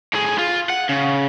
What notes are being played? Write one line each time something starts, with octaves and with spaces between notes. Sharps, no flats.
A2 G#4
F4
F#5
C#3